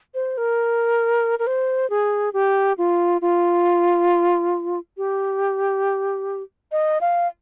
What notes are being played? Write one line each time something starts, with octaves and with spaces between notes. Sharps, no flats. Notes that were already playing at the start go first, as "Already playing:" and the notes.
C5
A#4
A#4
C5
G#4
G4
F4
F4
G4
D#5
F5